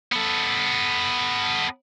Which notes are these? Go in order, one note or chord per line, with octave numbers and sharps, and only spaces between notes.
B3 A4